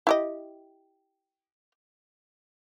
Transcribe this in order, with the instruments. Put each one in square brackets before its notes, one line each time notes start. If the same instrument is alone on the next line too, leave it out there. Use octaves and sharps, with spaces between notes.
[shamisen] E4 G4 D#5